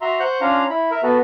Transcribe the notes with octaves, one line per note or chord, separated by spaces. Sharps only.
F#4 E5 A#5 C6
C5 F#5 C#6 F#6 G6
C#4 D4 F4 F5 A#5
E4 B5
A#4 E5
B3 F#4 A4 B4